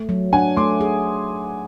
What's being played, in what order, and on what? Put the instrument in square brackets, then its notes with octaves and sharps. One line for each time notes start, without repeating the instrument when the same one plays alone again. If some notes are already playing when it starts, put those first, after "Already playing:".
Already playing: [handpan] A3
F#3
[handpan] D4 [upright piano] F#5 G#5
[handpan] A3 [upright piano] C6 D6
[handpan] G#4